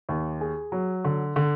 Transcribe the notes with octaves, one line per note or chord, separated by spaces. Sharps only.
D#2
G#4
F#3
D3
D3